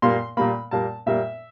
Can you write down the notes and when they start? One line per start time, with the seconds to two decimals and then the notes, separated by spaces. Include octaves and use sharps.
0.02 A#2 G3 A#3 C6
0.37 A#2 G3 A#3 B5
0.71 A#2 G3 A#3 A5
1.06 A#2 G3 A#3 E5